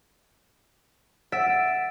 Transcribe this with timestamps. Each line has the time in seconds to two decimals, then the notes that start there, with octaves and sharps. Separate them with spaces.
1.32 E5 F#5 A6 D7